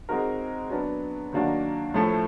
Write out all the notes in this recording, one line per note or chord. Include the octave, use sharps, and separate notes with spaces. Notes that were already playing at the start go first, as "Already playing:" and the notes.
G#3 C4 D#4 F#4 A#4
F#3 B3 D4
D#3 F#3 A#3 D4 F#4
A2 F3 A3